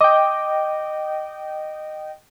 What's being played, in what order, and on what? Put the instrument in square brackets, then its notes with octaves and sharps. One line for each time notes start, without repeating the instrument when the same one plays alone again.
[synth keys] D#5 G5 [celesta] D6